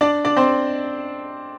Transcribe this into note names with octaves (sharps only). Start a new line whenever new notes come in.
D4 D5
D4 D5
C4 C5